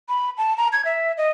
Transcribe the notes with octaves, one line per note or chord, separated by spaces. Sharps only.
B5
A5
A#5
G#6
E5
D#5